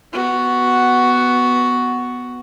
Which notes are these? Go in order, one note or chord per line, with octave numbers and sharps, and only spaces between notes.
B3 F#4